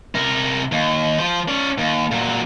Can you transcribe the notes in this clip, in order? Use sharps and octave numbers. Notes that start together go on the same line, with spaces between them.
C3 A#4
D#2
F3 C5
C#4 D5
D#2
A#2 F#3